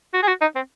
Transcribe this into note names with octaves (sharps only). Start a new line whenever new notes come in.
F#4
G#4
F#4
D#4
C4